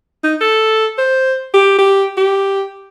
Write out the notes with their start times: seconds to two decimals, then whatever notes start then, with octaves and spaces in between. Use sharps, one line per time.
0.24 D#4
0.41 A4
0.98 C5
1.54 G4
1.78 G4
2.17 G4